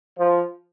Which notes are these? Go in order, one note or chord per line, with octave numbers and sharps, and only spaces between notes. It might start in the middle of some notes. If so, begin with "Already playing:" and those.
F3